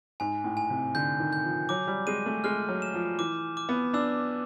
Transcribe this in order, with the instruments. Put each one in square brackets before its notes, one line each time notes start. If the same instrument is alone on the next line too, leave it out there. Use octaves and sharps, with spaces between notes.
[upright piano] G#2 [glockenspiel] G#5
[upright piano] A2
[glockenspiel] G#5
[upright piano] C3
[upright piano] D3 [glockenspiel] G6
[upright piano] D#3
[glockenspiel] G6
[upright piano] F3
[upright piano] F#3 [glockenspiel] D6
[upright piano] G3
[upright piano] G#3 [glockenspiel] D#7
[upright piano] A3
[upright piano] G#3 [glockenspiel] F6
[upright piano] F#3
[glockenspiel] E7
[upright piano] F3
[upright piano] E3 [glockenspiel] D6
[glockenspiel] D6
[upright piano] B3
[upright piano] D4 [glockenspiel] E6